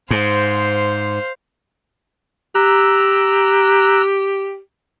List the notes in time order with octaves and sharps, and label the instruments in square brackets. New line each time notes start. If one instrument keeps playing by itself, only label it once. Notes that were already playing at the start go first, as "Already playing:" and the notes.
[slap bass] G#2 [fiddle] C5 F5
[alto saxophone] G4 [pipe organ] A#5 E6 F#6